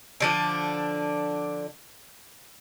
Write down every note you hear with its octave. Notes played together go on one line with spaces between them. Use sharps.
D3 F3 D4